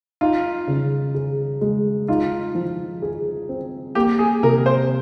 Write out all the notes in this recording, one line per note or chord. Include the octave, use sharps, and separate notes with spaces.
D#4 F4
C#3
G#4
G#3
D#4 F4
F3
G#4
C4
A#3 G4
G#4
C3 A#4
C5